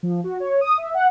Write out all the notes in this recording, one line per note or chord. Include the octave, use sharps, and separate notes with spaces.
F3
F#4
C#5
D#6
E5
F#5